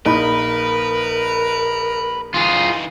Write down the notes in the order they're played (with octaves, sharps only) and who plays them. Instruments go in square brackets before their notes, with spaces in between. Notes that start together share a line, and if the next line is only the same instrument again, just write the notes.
[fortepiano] A#1 D#4 B5 [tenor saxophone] A#4 [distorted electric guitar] B4
[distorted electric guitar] E3 D#4 [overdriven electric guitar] F4 G#4